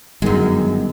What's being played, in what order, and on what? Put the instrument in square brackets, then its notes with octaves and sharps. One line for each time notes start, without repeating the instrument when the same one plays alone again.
[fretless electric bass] G1 D#3 [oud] F#2 G#3